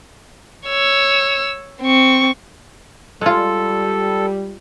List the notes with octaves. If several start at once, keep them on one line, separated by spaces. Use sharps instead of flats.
C#5 E6
C4 C#6
G3 G#3 F4 A4